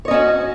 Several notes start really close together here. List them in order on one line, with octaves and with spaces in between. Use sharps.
C#5 D#5 C#4 F#4